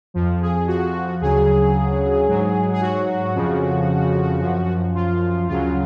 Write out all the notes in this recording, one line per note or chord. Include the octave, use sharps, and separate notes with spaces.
F2 F3
G#4
F#4
D2 C#3 F#3 G#4
G#2 F#3
G#4
F#4
F2 C#3 F3
F#2 F3
F4
D2 C#3 F#3 F4